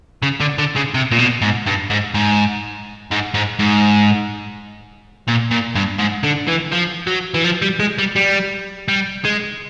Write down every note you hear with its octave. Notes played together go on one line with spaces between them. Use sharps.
C#3
D3
D3
C#3
C3
A#2
B2
G#2
G2
G#2
G#2
G#2
G#2
G#2
A#2
A#2
G2
G#2
D3
E3
F3
F#3
E3
F3
G3
G#3
G3
G3
G3
G#3